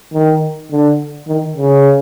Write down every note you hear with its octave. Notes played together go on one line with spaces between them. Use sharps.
D#3
D3
D#3
C#3